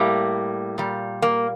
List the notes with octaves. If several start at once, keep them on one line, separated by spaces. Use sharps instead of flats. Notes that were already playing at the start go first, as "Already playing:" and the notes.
Already playing: A2 G3 A#3
A#2 G3
A#3